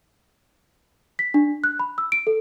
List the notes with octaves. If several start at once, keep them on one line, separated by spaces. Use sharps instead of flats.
B6
D4
F#6
B5
E6
D7
A4